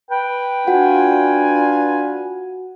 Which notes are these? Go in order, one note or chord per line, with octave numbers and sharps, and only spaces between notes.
B4 G5
D4 F4 F#4 F#5 G#5